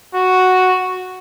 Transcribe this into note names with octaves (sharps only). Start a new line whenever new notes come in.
F#4